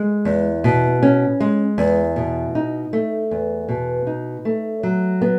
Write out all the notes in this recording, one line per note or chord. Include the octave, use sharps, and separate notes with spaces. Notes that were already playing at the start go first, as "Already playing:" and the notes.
Already playing: G#3
E2
B2
C#4
G#3
E2
B2
D#4
A3
E2
B2
D#4
A3
F#3
B3